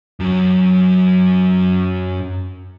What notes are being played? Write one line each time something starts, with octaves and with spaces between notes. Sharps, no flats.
F#2 F#3